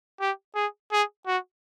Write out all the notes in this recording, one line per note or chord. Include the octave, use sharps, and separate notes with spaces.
G4
G#4
G#4
F#4